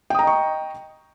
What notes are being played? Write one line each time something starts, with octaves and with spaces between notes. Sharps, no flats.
D#5 G5 A#5 C#6 D#6